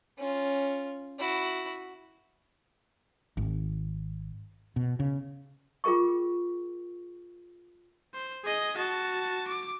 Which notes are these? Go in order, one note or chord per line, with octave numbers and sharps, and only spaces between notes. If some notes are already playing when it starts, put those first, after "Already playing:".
C#4 F4
E4 F#4
G#1
B2
C#3
F4 G#4 A#4 G5 C#6
C5
G#4 D#5
F#4 A5
D6